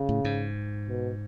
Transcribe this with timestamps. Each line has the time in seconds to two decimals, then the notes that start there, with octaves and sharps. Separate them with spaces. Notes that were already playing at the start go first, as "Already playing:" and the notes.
Already playing: C#3
0.09 A2
0.24 G#2
0.89 B2